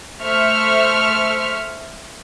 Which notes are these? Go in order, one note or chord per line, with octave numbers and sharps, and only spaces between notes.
A3 C5 E5 C#6 F6